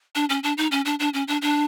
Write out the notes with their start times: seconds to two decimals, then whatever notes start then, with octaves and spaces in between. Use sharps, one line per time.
0.15 D4
0.29 C#4
0.43 D4
0.58 D#4
0.72 C#4
0.85 D4
0.99 D4
1.14 C#4
1.28 D4
1.42 D4